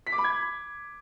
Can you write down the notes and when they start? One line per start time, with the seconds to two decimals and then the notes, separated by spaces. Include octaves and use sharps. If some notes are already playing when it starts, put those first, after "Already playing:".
0.07 B6
0.12 D6
0.18 B5
0.24 G#6